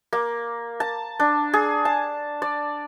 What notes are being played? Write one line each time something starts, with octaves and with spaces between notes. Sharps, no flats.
A#3
A5
D4
G#4
A5
D5